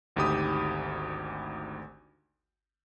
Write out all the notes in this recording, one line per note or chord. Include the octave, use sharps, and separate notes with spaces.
G#1 D2 D#4 G4 B5 D#6